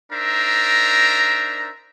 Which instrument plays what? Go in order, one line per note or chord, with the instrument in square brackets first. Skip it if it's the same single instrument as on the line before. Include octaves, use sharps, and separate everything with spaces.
[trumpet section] D4 D#4 A#4 C5 E5 A#5